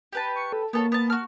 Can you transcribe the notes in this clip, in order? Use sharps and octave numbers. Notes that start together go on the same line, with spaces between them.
G4 B4 A5
C#6
A4
A#3 B3 A4 C#5
B3 A5
F#4 F6